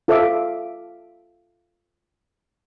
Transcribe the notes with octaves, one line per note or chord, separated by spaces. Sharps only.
F4 A4 C5 E5 F5 D6